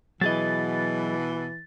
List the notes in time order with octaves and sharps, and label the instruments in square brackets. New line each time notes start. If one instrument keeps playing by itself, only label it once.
[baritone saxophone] B2 [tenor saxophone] E3 [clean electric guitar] F#3 G#4 D#5 [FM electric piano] A6